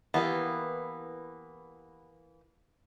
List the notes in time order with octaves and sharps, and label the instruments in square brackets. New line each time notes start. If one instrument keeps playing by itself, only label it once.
[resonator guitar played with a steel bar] E3 A#3 [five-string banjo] B3 G4